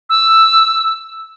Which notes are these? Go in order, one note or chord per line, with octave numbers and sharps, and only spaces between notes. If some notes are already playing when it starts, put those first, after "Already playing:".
E6